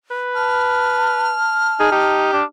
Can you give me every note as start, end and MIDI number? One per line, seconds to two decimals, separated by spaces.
0.11 1.34 71
0.35 2.22 81
0.35 2.42 89
1.80 1.91 63
1.80 1.88 68
1.92 2.31 63
1.92 2.41 67
2.33 2.44 62